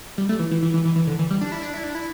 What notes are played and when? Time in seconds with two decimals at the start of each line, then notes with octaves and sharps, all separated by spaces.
0.18 G3
0.29 A3
0.39 E3
0.51 E3
0.62 E3
0.74 E3
0.85 E3
0.96 E3
1.07 D3
1.19 E3
1.30 G3
1.41 D4
1.52 E4
1.63 D4
1.74 E4
1.84 D4
1.95 E4